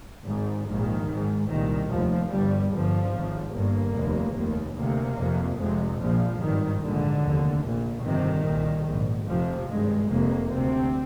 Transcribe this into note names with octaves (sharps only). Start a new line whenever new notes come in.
G#1 G#2
A#1 G#2 D#3
G#1 G#2
C2 A#2 D#3
F1 D#2 F3
G1 G2 G3
G1 G2 F3
G#1 G#2
G1 G2 A#3
F1 D#2
F1 D#2
D2 C3 A#3
F1 F2 C3
F1 F2 C3 G#3
A#1 A#2 F3
G#1 G2 D#3
A#1 G#2 D3
F1 D#2
A#1 A#2
G1 F2 C3 D#3
C2 A#2
A#1 G#2
F1 F2 C3 F3
G#1 G2 G#3
F1 F2 C3 A#3
D2 C3 C4